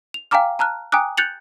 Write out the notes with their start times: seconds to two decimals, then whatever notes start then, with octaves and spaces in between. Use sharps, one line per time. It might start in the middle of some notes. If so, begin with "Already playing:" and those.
0.14 F7
0.31 F5 G5 G#5 A#5 D6 F6
0.59 A5 A#5 F6 F#6
0.92 G5 G#5 A#5 D6 D#6 F#6
1.17 F#6 G6 A6 C#7 F7 F#7